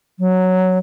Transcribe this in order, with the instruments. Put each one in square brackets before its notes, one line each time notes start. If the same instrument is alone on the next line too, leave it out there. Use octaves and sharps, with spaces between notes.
[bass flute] F#3